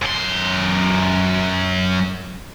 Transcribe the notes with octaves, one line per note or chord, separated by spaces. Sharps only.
F#2 C6